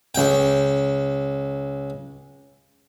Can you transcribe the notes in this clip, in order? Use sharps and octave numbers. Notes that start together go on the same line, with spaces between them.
C#2 G5